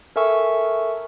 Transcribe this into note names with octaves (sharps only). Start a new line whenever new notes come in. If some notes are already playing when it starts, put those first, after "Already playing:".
A4 A#4 E5 G#5 C#6 E6